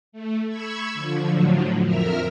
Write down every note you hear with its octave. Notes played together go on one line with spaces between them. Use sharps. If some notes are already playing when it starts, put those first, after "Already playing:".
A3
B5 C#6 E6 G#6
D3 F3
A2 D3 F3 F#3
F2 A#4 E5 F6